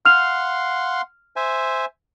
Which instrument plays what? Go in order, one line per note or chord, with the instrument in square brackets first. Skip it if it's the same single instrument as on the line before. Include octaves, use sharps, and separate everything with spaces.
[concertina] F5 F#5 C6 [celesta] F6 F7
[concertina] C5 E5 G#5